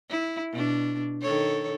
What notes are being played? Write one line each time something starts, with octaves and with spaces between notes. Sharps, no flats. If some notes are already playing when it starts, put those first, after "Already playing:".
E4
B2 D4
D#3 A4 C#5